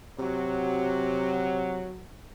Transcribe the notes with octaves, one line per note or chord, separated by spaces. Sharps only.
C3 F#3